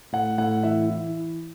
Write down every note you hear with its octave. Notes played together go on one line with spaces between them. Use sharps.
A2 F#5
A2 F#5
E3 E5
E3